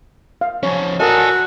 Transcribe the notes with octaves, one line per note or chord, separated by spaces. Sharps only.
F5
F3 C#4 C#5
F#4 A4 A#4 D5 D#5 G#5